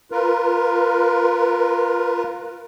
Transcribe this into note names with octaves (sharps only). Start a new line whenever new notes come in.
F4 A#4 B4